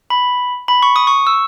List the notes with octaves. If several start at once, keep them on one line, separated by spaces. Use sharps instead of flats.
B5
B5
C#6
D#6
C#6
E6